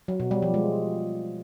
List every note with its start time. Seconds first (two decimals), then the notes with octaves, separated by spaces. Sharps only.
0.08 F#3
0.20 B2
0.31 G3
0.42 F3
0.54 G#3